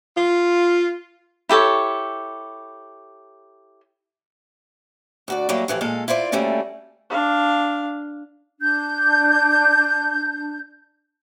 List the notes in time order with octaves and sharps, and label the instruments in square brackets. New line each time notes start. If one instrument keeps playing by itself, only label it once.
[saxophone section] F4
[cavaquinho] E4 G4 A4 C#5
[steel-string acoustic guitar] D2 F#4 D5
F#3 G3 A3 A#3
A2 E3 F3 G4
A#2 G#3 A4 F5
E4 F4 C5 D5
D2 G3 A3 A#3 C#4 A4
[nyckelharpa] D4 F5
[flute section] D4 G6